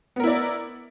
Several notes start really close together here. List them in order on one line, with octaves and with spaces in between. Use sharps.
B3 A#4 E4 D5